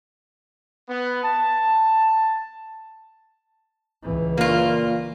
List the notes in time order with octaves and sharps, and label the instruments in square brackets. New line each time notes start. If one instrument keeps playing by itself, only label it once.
[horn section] B3
A5
[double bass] C#2 E3
[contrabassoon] A#2 [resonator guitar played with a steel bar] A#3 F4